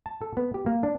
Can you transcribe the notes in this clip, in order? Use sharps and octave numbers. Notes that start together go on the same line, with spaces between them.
A5
A4
B3
G4
A#3
D4